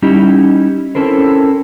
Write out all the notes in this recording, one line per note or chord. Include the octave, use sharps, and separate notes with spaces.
G3 C#4 D#4 E4 G4
C4 C#4 E4 A4 A#4 C5